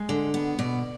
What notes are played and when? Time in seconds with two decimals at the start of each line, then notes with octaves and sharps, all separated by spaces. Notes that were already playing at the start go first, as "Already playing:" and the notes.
Already playing: G#3 D#5
0.09 D3
0.34 B3
0.59 B2 D5